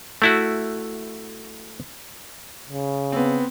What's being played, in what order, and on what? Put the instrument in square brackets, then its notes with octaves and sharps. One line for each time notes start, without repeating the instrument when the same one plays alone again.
[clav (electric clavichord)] A3 E4 F#4
[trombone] C#3
[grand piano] B3 C4